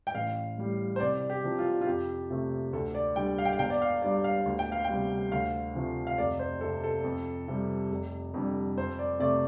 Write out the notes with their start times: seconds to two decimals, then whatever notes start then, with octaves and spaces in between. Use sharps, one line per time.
0.07 G5
0.15 A1 F5
0.58 A2 G3
0.96 C5
1.00 C2 D5
1.30 G4
1.43 C3 F3
1.59 F4
1.81 F4
1.87 F2 G4
2.30 C3 A3
2.73 D2 A4
2.95 D5
3.16 D3 G3 G5
3.38 F5
3.45 G5
3.53 F5
3.59 G1 G5
3.70 D5
3.82 F5
4.02 G2 G3 D5
4.24 F5
4.46 D2
4.59 G5
4.72 F5
4.84 G5
4.89 C3 G3
5.31 D2 F5
5.75 C3 F3 A3
6.07 F5
6.18 F1 D5
6.39 C5
6.61 F2 C3 A4
6.83 A4
7.04 F2
7.48 C3 G3
7.91 F1
8.34 F2 D3 G3
8.77 F2 C5
8.99 D5
9.20 C3 A3 D5